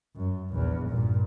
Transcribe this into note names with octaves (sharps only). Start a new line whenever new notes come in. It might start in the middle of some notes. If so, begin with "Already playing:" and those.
F#2
A#1 E2
G2 A#2